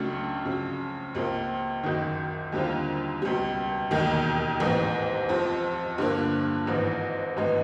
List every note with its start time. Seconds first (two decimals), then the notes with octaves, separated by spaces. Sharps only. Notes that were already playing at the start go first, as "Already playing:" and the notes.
Already playing: C#2 C#3 F#3 A3 D4
0.45 F2 C#3 F#3
1.15 C#2 C3 F3 A#3
1.83 F#1 F#2 D#3
2.52 D#2 D3 G3 C4 F4
3.22 C#2 B2 G3
3.91 E1 D#2 D#3
4.60 A1 G#2 E3
5.29 F2 C3 F3
5.98 G2 D3 F3 A#3
6.67 G#1 G#2 E3
7.37 G#1 G2 E3 G#3 B3